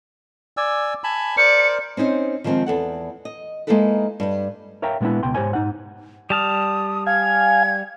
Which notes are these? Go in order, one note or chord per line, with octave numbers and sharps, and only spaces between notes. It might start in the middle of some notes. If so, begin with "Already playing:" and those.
D5 G#5 E6
G#5 A5 B5
A#4 C5 D5 C#7
C4 C#4 D#4 C5
D#3 F3 G#3 A3 C4
E2 A4 F#5
D#5
G#3 A#3 D#4 E4 A4 B4
G2 G3
A#4 C#5 E5 F5 G5 A#5
A#2 G#3 B3 D4 E4
C#2 B2 G5 C6
G#2 D3 G4 C5 C#5 G#5
G#2 D#4 F#5
G3 A5 D#6 F6
F5 G#5 G#6